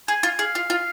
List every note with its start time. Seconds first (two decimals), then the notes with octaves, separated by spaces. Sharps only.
0.08 G#4 G#5
0.23 F4
0.39 G#4 F5
0.55 F4
0.70 F4